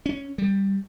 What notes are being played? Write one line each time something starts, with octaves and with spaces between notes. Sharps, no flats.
C#4
G3